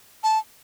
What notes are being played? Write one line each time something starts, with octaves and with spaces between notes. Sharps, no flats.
A5